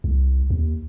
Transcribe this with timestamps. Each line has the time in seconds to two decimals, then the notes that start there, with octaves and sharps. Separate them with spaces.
0.04 C2
0.50 D#2